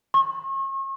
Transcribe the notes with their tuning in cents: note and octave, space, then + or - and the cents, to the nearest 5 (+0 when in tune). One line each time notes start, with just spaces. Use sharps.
C#6 -40